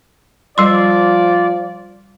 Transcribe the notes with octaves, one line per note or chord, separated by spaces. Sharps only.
F3 G3 F4 D5 C6